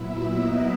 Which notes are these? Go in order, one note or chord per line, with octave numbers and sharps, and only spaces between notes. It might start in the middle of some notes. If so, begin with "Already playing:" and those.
Already playing: A#2 F#3 B3 E4 E5
D#4 D#5